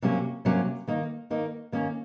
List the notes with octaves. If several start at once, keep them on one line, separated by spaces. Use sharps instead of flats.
C3 F#3 A#3 C#4
C3 F#3 A#3 C#4
D#3 A#3 D#4
D#3 A#3 D#4
D#3 A#3 C#4